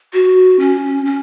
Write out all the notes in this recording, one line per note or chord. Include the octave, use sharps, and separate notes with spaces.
F#4
C#4
C#4